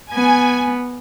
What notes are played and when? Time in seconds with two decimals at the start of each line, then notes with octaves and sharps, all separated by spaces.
0.13 B3 G#5